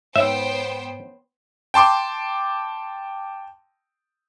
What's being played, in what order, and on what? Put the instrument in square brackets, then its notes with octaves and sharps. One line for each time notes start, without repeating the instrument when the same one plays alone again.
[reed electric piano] G#2 [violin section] B3 C5 G5 [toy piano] C#5 [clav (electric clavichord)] E5
[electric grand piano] G5 A5 C6 D6